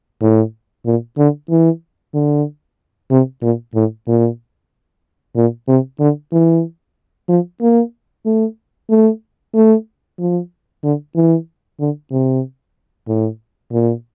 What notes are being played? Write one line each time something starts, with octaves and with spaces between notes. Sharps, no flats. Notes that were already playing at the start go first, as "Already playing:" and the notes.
A2
A#2
D3
E3
D3
C3
A#2
A2
A#2
A#2
C3
D3
E3
F3
A#3
A3
A3
A3
F3
D3
E3
D3
C3
A2
A#2